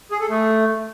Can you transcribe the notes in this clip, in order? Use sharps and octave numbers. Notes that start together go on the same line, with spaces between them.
G#4
A4
A3